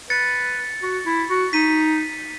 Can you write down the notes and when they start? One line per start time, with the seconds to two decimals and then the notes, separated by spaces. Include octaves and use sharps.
0.10 B4 A6 C#7
0.82 F#4
1.06 E4
1.30 F#4
1.53 D#4 B6 D#7